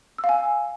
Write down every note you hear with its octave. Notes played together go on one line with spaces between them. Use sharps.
E6
F5
G#5